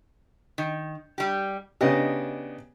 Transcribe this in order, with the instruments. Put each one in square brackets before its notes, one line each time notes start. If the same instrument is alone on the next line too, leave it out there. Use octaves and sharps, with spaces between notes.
[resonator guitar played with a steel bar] D#3
G3 G4
[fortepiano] C#3 B3 G4 [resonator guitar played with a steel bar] D4 D#5